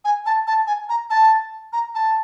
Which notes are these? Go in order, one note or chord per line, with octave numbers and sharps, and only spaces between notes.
G#5
A5
A5
G#5
A#5
A5
A#5
A5